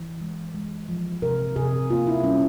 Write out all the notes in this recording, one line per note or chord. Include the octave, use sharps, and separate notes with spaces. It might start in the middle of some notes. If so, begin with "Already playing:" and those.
Already playing: E3
G#3
G#3
F3
C3 A#4
C3 G#4
A#3 F4
E4
G3 C#4